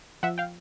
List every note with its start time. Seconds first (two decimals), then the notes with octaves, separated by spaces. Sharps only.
0.23 F3 E5 F#5
0.38 F5 G5